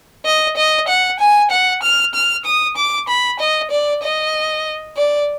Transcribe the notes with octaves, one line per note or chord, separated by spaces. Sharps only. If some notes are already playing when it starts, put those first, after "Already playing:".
D#5
D#5
F#5
G#5
F#5
F6
F6
D#6
D6
B5
D#5
D5
D#5
D5